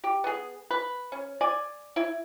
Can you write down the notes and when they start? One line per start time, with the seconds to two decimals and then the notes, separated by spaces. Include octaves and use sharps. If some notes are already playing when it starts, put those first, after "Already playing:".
0.04 G4
0.24 B3 G#4
0.71 B4
1.12 C#4
1.41 D5 G#5
1.96 E4